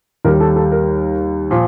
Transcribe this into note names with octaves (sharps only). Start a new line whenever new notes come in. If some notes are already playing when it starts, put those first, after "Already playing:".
D#2 D#3 G3 A#4
A4
A4
A#4
A#2 F3